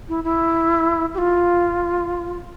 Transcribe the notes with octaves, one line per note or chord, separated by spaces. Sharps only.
E4
E4
G4
F4